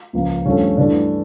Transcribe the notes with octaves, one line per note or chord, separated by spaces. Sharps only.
C#2 C#3 F3 A#3
G2 F3 A3 C#4
G2 E3 A3 D4